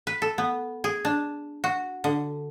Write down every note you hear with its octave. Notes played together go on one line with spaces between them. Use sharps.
B4
A4
B3
G#4
D4
F#4
D3